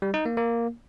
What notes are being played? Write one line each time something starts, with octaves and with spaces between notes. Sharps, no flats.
G3
D#4
A#3
A#3